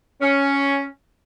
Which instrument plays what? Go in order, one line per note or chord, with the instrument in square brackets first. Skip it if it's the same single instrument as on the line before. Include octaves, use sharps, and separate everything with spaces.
[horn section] C#4